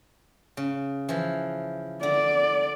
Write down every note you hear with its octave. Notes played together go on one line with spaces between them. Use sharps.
C#3
E3 F3
D3 D5